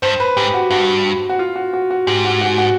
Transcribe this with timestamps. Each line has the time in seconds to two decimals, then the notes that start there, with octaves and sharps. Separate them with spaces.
0.02 G2 C5
0.20 B4
0.37 G#2 G4
0.54 F#4
0.71 G2 F#4
1.29 F#4
1.39 F4
1.56 F#4
1.73 F#4
1.90 F#4
2.07 G#2 G4
2.25 F#4
2.41 F#4
2.58 F#4